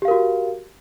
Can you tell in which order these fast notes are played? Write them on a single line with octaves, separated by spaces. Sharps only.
G4 F5 A#4 F#4